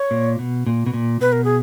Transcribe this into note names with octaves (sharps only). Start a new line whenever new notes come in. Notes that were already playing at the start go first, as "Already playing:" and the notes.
Already playing: C#5
A#2
B2
A#2
B2
A#2
B2 B4
A#4
G#4